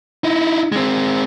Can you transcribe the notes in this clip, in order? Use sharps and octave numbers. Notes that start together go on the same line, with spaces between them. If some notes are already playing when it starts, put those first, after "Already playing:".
D#4 E4
G#3 C4